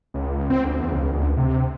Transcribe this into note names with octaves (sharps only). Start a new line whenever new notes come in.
C#2
C4
D2
E2
C#2
D2
C3